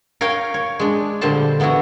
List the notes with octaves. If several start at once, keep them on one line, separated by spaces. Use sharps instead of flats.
A#4 C#5 F5 G5
C#5
G#3 D4
A#2 D3 G3 C5 A5
E3 B3 D4 E4 F#4